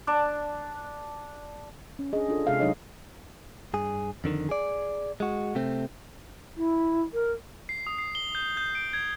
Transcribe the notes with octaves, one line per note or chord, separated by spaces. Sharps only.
D4 A5 D6
C#4
D4 G#4 D#5
D4 F4 A4
C3 G#3 G#4 E5 F5
F#3 D4 D#4 G#4 C#5 D#5
G2 G#4
F2 D3 D#3
G#4 D5
G#3 F#4
C3 A3 C4
E4
A#4
C7
D#6
C7
G7
G6
G6
D7
G#6